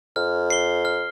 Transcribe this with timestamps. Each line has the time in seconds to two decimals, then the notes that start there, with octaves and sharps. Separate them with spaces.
0.16 F2 F6
0.50 C7 G7
0.85 F6